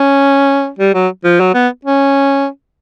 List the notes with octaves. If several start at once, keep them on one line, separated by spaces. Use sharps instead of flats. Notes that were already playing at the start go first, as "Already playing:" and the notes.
Already playing: C#4
G3
F#3
F3
F#3
B3
C#4